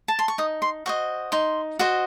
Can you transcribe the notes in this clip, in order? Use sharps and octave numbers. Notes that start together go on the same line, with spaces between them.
A5
C6
C#6
D#4 D#6
C6
F#4 C5 D#5 C#6
D#4 C6
F#4 C5 D#5